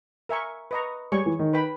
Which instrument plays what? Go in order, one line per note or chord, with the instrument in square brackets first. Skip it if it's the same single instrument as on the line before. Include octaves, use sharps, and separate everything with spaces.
[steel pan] A#4 E5 G#5 C#6
B4 D#5 A#5 C#6
[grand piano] G3 [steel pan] G#4 C#5 G#5 C#6
[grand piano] E3
D#3
[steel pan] B4 G5 B5